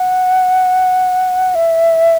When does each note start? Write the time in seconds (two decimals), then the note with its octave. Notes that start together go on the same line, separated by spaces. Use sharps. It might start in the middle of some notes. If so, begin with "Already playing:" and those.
Already playing: F#5
1.55 E5